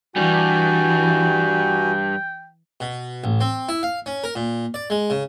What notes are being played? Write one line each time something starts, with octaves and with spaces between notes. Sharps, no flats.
G2 E3 G3 F#4 G5 G#5
B2
A1
C4
E4
F5
C#4
A#4
A#2
D5
G#3
C#3